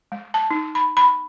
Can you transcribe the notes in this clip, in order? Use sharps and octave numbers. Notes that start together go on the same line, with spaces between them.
G#3
A5
D#4
B5
B5